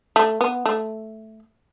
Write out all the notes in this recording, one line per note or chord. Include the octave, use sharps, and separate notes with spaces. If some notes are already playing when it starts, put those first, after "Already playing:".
A3
B3
A3